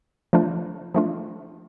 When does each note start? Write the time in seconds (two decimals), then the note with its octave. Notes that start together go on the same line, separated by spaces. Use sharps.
0.33 F3 A3 D4 F4
0.94 F3 A3 D4 F4